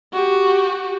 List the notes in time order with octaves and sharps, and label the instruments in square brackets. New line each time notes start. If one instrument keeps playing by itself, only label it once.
[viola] F#4 G4